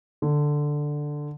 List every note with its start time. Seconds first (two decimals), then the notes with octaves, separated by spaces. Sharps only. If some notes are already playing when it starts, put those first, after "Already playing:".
0.22 D3